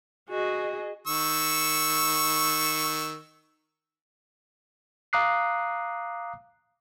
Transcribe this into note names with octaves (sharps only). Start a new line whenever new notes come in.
F#4 G#4 D#5
D#3 C#6 E6
F5 A#5 D6 D#6 F#6 C7